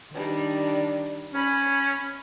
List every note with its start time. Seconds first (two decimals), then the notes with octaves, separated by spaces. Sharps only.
0.11 D#3 G3 D4
1.34 C#4 B5